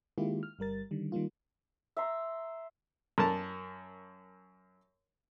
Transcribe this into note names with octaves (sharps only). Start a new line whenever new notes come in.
D#3 G#3 A#3 E4 F4 G4
F6
G1 G3 A#4 A6
D3 D#3 G3
D#3 G3 A#3 F4
E5 A#5 C6
F#2 A#4 A5